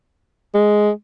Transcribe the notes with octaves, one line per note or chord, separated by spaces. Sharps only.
G#3